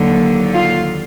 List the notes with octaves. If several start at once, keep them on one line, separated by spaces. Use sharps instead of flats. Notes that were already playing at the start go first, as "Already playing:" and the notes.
Already playing: D#2 D3 F#3
F4